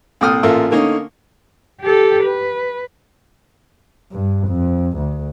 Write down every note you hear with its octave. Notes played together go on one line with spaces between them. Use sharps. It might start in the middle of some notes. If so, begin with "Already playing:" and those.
C2 A#2 A4 G5 D#6 F6
A1 A#2 F4 A4 A#4 E5
D3 A3 A#3 C#4 D#4
G4 A4
B4
G2
F2
D2